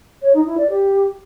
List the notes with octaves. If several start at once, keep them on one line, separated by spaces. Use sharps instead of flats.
C#5
D#4
E4
D5
G4